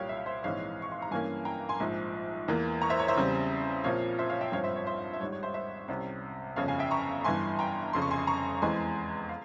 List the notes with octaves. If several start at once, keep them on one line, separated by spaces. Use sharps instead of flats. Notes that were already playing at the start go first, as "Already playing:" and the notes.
Already playing: C2 A#2 G3 C#5 F5 G5
E5
F5
C5 E5
A#1 G#2 E3 G#3 C4 C#5 F5
C#6
C6
A#5
G2 E3 A#3 C#4 F5 G#5
G5 A#5
G#5 C6
A#1 G#2 F3
E2 E3 A#3
A#5 C#6
C5 E5
C#5
C5 E5
E2 C#3 G3 C4
A#1 A#2 F3 C4 C#5 F5
C5 E5
C#5 F5
E5 G5
G#1 G2 F3 C4 C#5 F5
C5 E5
C#5
C5 E5
E5
G#1 G#2 G3 C#5
C#5
C5 E5
C5 E5
C2 C3 G3 C#4
G1 F2 C#3 C#5 F5
F5 G#5
E5 G5
A#5 C#6
G1 G2 E3 G#5 C6
G5 A#5
F1 F2 C#3 C6
C#6
G#5 C6
A#5 C#6
E2 E3 G#3 C4 G#5 C6
F5